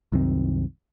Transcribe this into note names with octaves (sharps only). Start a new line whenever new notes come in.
C2 F#2 D#3 C4